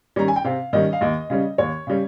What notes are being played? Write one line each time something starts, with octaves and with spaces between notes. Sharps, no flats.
D#3 G3 C#4 A#5
G#5
G5
C3 F5
D#3 G3 C#4 D#5
F5
D#2 D#5
C#3 G3 C#4
D#2 C#5
C#3 G3 C#4